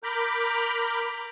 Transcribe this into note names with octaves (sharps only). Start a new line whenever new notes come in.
A#4 A#5 B5 D6 G6